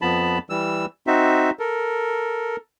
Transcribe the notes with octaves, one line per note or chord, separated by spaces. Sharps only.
F2 F3 B3 A5 B5
E3 G3 E6
C4 D#4 F#4 E5
A4 A#4